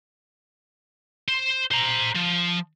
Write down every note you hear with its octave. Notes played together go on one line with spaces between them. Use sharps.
C5
C5 A#5
F3